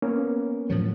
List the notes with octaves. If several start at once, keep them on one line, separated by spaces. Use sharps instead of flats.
A#3 B3 C#4
A2 F3 F#3